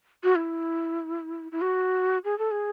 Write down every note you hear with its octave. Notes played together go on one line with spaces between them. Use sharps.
F#4
E4
E4
F#4
G#4
A4
G#4